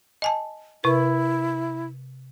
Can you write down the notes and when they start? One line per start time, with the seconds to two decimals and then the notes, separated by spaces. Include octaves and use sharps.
0.22 D#5 G#5 A5
0.84 C3 E4 B4